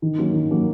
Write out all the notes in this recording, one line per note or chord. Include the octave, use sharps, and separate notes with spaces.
D#3
F#3 A#3 C#4
D#3
F#3 A#3 C#4